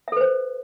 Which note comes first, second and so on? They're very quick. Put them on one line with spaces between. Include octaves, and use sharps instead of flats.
E5 A4 B4 C5